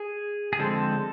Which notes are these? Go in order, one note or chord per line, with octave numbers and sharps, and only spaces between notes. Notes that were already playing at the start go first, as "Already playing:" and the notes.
Already playing: G#4
G#4
D3 F3 G#3 C4 A4